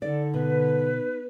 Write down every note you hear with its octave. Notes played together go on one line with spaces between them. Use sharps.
D3 D#4 A4 D5
B2 B4